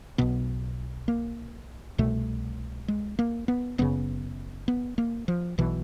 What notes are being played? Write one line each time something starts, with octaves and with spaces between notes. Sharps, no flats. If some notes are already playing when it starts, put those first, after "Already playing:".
B1 B2 B3
A#3
C2 B2 A3
G#3
A#3
B3
F#1 F#2 C#3 B3
B3
A#3
F3
B1 B2 E3